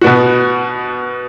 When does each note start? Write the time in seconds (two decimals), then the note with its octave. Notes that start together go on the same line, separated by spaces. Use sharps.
0.01 B2 B3 F#4